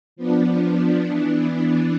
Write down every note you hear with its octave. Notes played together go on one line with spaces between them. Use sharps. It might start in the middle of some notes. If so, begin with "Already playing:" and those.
F3 B3 D4
E3 B3 D4